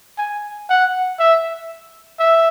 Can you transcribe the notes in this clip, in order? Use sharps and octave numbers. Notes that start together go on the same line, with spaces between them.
G#5
F#5
E5
E5